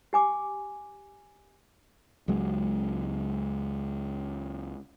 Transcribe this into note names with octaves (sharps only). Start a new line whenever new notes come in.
G4 G#5 D6
C#2 F#3 G#3